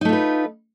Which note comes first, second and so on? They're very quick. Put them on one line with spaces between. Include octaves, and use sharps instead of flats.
D#4 A3 F4 B4